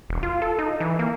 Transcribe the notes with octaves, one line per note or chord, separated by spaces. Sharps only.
E1
F4
A4
D#4
E3
A#3